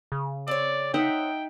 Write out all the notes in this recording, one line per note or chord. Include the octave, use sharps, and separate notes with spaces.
C#3
C4 C#5 D5
D#4 E5 F#5 G5